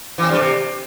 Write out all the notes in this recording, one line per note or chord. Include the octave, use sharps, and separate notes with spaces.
E3
C4
G2
A3
C3